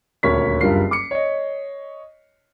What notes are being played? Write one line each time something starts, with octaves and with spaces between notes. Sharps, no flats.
D#1 D2 A#4 C#5 C#6 B6
F#1 G2 F4 A#4 C7
D6 C#7
C#5 D#5